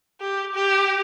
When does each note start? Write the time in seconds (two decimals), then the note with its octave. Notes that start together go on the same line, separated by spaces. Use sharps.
0.21 G4
0.54 G4